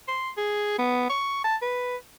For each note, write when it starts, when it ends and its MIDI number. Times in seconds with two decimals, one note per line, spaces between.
0.08 0.30 84
0.37 0.75 68
0.78 1.04 59
1.10 1.42 85
1.44 1.56 81
1.62 1.96 71